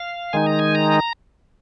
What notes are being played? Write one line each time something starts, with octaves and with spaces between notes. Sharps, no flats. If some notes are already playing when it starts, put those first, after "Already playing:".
Already playing: F5
D#3 G#3 D#4 G#5
A#5
G#5
A#5